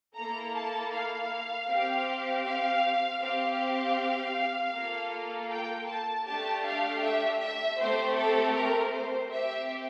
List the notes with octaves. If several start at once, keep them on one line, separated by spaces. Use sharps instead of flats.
A#3 E4 A4 A#5
A5
F5
C4 G4
F5
C4 G4 F5
A#3 F4 A4
G5
A5
A3 D4 G4 A5
F5
E5
E5
A3 C4 G4 C5
A4
A#4
C5
C4 G4 E5